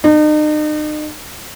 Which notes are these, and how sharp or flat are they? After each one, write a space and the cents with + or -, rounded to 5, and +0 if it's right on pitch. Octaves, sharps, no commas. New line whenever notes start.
D#4 -40